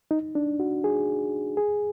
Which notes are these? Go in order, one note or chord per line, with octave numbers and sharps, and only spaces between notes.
D#4
D4
F#4
G#4
G#4